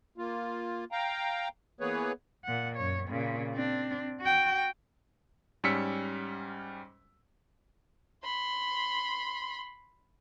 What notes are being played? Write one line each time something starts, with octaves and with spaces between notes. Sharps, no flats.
A#3 F4
F5 G5 A#5
E3 A#3 B3 G#4 B4 C#5
A#2 F#5
F#2 C#5
A#2 C#3
C4 D4
F#4 G5
G#2 G3 C#4 E6 B6 C#7
B5 C6